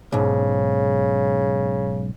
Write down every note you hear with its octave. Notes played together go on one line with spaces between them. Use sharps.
B1 G#2 C#3